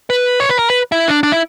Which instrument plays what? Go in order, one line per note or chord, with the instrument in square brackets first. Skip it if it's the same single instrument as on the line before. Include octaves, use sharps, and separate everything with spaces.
[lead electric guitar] B4
C#5
B4
A#4
B4
E4
D4
D4
E4